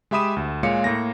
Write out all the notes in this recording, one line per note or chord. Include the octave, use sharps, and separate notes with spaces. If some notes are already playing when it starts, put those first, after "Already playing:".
G#3 G4 E5 B5 D#6 E7
D2
A#2 G#3 C#5 F5 C#7
A2 A#3 A#6